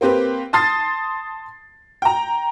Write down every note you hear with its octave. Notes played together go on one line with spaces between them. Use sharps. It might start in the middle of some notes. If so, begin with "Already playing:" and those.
A#3 C4 G4 B4
A5 C6 D#6 A6 C7
G5 A#5